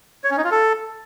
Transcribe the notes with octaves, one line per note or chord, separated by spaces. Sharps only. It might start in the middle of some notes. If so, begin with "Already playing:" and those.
C#5
C#4
D#4
F4
A4